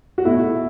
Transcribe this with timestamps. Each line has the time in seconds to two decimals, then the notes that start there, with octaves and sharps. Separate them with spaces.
0.18 F#4
0.25 B2 A3 E4